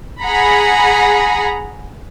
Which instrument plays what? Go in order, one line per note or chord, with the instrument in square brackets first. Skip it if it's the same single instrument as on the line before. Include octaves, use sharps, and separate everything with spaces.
[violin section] G#4 F#5 A#5 B5